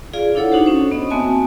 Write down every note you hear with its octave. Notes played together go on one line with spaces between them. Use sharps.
F4 G#4 D5 F5
D4 E4 A4 C#5 F#5
D4 D#4 F#4 G4 C5
C#4 C5 C#5
B3 D#5 D#6
A#3 C4 F#4 E5 G#5 A5